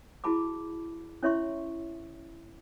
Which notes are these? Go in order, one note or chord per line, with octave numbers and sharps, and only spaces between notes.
E4 F#4 G#4 A5 B5 D6
C#4 E4 C#5 E5 C6 C#6